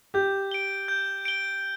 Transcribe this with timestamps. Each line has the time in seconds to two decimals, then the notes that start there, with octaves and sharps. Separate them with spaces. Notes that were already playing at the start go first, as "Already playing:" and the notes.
0.14 G4 G6
0.51 D7 G7
0.88 G6
1.25 D7 G7